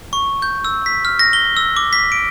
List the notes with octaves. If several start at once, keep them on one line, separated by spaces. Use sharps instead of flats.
C#6
G6
E6
B6
F6
A#6
G7
E6
D6
B6
D7